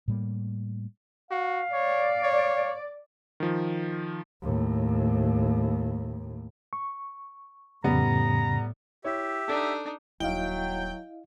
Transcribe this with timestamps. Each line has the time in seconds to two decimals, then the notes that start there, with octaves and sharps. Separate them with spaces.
0.08 A2 G3 A#3
1.31 F#4 F5
1.72 C#5 D5
2.23 C#5
3.40 D#3 F3
4.42 D#2 A2
6.73 C#6
7.84 F2 A2 C#3 G3 B3 A#5
9.04 E4 G4 C#5 E5
9.48 D4 D#4 A4
10.20 D#1 F#3 D#4 E4 D#5 F5 G5